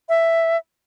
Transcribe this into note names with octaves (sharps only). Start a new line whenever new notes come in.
E5